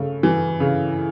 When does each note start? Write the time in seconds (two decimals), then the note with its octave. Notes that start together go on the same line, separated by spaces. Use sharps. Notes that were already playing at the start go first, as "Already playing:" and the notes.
Already playing: C#3 A3
0.23 E3
0.60 C#3